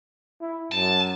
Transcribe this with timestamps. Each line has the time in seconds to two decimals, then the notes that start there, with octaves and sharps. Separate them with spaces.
0.41 E4
0.72 F#2 A5